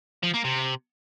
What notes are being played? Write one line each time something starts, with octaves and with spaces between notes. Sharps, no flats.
F3
A#3
C3